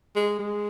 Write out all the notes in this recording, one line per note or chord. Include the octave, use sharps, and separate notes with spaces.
G#3
G#3